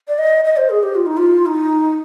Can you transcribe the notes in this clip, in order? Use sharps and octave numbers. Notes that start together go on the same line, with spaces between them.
D5
D#5
D#5
C5
G#4
G4
F4
D#4
F4
D#4